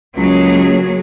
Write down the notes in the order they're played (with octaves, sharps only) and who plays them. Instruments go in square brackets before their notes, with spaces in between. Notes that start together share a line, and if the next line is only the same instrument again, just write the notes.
[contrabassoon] C#2 [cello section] F#3 A#3 G#4